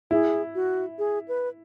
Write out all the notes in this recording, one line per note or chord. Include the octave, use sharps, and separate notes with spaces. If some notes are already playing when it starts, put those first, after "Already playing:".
E4 G#4
F#4
G#4
B4